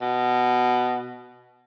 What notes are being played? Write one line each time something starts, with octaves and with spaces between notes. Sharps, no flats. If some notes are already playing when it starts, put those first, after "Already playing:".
B2